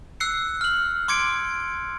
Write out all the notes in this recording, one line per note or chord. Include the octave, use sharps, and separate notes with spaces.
E6 F#6 C7 C#7
F6 F#7
C6 D6 G#6 C#7 D7